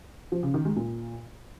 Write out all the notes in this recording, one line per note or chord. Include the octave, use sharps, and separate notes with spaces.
F3
C#3
D#3
G#3
A#2